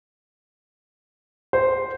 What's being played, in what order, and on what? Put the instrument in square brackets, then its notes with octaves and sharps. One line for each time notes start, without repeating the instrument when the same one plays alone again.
[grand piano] C5